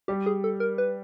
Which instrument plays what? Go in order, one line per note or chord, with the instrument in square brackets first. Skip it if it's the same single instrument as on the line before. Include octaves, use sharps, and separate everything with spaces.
[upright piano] G3 [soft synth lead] G4
[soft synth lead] G#4
A4
A#4
B4